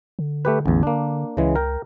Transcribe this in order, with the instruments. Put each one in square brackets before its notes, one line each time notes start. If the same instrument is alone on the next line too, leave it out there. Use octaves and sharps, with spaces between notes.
[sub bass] D3
[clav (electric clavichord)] A3 G4 B4
A1 E2
A#3 D4
[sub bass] C#2 [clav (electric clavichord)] C#3 E3 G#3
[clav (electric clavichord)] A#4 G5